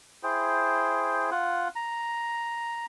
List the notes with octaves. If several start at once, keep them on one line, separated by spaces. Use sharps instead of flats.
E4 G#4 C5 G5
F4 F#5
A#5